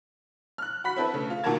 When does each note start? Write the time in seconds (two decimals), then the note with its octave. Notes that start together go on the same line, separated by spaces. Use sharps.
0.58 F6 F#6
0.84 F#4 B5 B6
0.96 C4 E4 A4 B4
1.13 C#3 A3
1.30 F4
1.44 A#2 D#3 F#4 A#4 A5 G#6